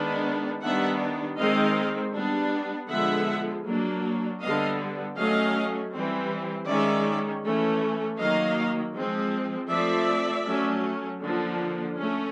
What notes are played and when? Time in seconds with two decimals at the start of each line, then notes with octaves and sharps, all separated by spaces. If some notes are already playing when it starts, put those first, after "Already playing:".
Already playing: D#3 G#3 B3 D4
0.62 D#3 G3 B3 D4 E5 F#5
1.38 D#3 G#3 C4 D#5 F5
2.13 G3 B3 D4
2.89 D3 F3 G#3 B3 E5 F#5
3.65 F#3 A#3 D4
4.40 D3 G3 B3 D#5 F5
5.16 F#3 A3 C#4 D#5 F5
5.92 E3 G3 C4
6.67 D#3 G#3 C#4 D5 E5
7.43 E3 A3 C#4
8.18 D#3 F#3 A#3 D#5 F5
8.95 F3 G#3 C4
9.70 F3 A3 C4 D5 E5
10.46 F#3 A3 C#4
11.22 D3 F3 A#3 D4
11.97 A3 C#4